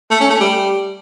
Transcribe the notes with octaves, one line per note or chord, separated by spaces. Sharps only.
A3
C#4
A3
G3